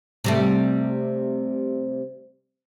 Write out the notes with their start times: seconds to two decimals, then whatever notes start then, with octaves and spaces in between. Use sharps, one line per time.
0.24 C3 G3 A3